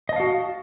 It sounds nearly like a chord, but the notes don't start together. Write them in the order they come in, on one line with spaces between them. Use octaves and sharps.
D#5 A5 F5 F#4